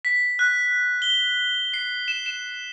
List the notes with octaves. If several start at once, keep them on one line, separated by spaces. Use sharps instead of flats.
B6
F#6
G7
C7
E7
E7